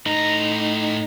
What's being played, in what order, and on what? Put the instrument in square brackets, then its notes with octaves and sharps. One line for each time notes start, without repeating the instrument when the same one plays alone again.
[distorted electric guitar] A2 A#5 [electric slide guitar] D#4